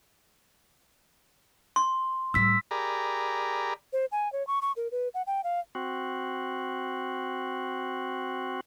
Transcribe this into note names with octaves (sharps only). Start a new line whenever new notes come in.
C6
A2 G3 E6 B6
G4 G#4 A#4 D5 A#5 B5
C5
G#5
C#5
C#6
C#6
A#4
B4
F#5
G5
F5
C4 F#4